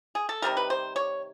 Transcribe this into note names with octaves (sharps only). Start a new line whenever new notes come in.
G#4
A4
C3 D#3 G3 A#4
B4
C5
C#5